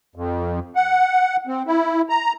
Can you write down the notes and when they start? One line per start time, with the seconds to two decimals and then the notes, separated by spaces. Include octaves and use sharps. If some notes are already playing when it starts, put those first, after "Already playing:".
0.15 F2
0.76 F#5
1.47 C4
1.67 E4
2.09 A#5